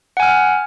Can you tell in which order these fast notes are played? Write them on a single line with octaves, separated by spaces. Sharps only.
F#5 G#5 F6